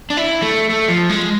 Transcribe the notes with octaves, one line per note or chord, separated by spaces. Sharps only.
D4
E4
A3
A3
F3
G#3